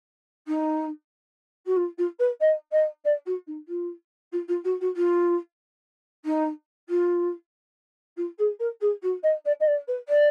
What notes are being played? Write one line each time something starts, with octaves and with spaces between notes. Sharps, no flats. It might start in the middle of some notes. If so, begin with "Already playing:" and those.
D#4
F#4
F4
F4
B4
D#5
D#5
D5
F#4
D#4
F4
F4
F4
F#4
F#4
F4
D#4
F4
F4
G#4
A#4
G#4
F#4
D#5
D5
D#5
D5
B4
D5